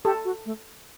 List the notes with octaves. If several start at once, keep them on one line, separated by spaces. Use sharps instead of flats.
G4 A4
F#4
A3